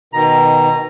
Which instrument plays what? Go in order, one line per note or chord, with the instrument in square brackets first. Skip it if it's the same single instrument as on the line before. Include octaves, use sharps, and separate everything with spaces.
[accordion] B2 D#3 [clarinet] A#5